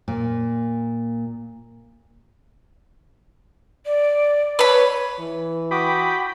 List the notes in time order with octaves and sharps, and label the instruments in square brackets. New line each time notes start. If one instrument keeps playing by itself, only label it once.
[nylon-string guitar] A#2
[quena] D5
[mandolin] B4 B5 [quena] C#5
[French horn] E3
[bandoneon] F#4 D6 D#6 [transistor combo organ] G5 B5